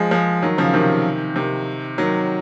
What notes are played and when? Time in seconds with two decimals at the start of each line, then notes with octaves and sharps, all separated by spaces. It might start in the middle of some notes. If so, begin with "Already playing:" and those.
Already playing: F3 G#3
0.11 F3 G#3
0.43 D#3 F#3
0.58 C#3 F3
0.73 C3 D#3
1.36 C3 D#3
1.98 D#3 F#3